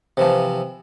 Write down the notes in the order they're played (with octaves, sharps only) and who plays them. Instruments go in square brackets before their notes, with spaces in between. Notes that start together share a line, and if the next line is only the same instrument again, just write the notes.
[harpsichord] C3 E3 F3